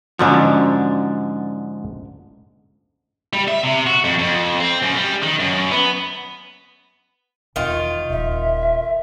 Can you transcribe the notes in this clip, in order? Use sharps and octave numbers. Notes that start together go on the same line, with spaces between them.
G#2 D3 F3 C#4 D4 F#4
G3
E5
C3
F#4
F2
F2
C4
F#2
G3
D#3
F#2
B3
E1 D#3 F4
D#1 E5